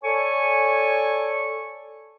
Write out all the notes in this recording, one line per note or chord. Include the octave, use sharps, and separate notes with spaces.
A4 C#5 D5 G#5 C#6